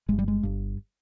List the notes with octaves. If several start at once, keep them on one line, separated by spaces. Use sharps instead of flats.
G1 G2 G#3
G3
G#3
G1 G2